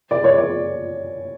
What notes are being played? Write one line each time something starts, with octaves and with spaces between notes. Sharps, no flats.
D5
C#5
D5